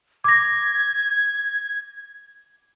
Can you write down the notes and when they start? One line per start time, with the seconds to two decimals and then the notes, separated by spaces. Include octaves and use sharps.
0.24 D6 G#6 A#6